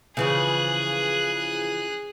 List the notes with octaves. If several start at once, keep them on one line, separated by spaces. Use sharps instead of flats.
C#3 E3 F3 G#4 F#6